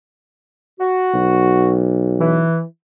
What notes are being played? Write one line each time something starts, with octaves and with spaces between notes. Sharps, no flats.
F#4
B1
E3